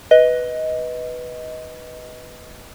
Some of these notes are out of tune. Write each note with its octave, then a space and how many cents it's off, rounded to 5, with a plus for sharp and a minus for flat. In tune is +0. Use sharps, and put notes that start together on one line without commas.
B4 +0 D#5 +15